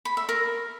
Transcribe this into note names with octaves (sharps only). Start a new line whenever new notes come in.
B5
E5
A#4